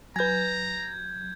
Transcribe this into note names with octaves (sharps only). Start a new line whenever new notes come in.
F#3 B4 G#5 A#5 G6 G#6